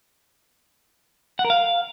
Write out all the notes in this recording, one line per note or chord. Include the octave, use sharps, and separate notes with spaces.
F#5
A#4
F5